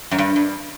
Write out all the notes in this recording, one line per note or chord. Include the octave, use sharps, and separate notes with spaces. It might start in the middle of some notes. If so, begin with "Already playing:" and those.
F#2
G2
G2